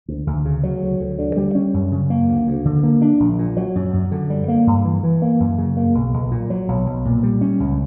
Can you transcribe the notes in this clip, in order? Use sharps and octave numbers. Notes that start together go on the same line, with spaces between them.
D2
D2
C#3
F#3
D2
D2
D3
G3
C#4
F#2
C#3
A#3
D2
D2
D3
A#3
D4
A#1
A#2
F#3
F#2
F#2
D3
G3
A#3
G2
E3
E3
A#3
F#2
C#3
A#3
B1
B1
A#2
F#3
B1
B1
A#2
G3
C#4
C#2